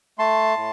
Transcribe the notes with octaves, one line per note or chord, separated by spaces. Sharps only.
A3 A5 C6
A2